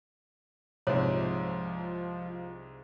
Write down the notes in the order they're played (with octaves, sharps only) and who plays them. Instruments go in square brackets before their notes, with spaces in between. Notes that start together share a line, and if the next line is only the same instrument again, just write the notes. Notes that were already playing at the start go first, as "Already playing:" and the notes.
[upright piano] C2 G#2 [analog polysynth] F3 [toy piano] C#5